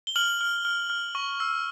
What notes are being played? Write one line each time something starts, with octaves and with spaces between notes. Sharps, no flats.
G7
F6 F#7
F6
F6
F6
C#6
E6